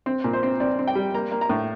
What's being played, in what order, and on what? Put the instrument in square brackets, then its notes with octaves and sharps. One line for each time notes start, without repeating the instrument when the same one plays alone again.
[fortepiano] C4
A#2
C5
C4
C4 D5
C4
G5
G3
A#3 A#5
A#3
A#5
A2